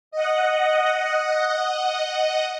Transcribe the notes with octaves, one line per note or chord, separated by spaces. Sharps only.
D#5 F#5